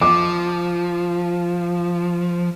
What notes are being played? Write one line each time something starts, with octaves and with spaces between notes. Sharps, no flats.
F3 D6